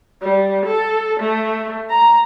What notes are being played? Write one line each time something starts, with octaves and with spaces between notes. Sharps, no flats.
G3
A4
A3
A#5